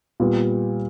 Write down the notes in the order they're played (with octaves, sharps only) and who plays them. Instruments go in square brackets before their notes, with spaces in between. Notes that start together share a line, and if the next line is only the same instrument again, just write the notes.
[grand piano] A#2 G3 B3